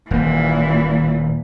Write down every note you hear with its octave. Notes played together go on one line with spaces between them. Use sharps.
D#1 A#2 E3 A#3